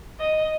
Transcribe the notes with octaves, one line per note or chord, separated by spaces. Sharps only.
D#5